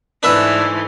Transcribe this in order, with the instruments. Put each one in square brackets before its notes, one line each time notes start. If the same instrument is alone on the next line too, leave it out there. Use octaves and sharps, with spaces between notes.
[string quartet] G#2 E3 A3 [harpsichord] D4 B4 E5